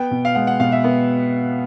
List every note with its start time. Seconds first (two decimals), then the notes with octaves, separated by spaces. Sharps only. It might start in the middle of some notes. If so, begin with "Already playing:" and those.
Already playing: B3 G5
0.11 B2
0.25 F5
0.35 G#3 F#5
0.47 F#5
0.60 B2 F5
0.72 E5
0.84 B3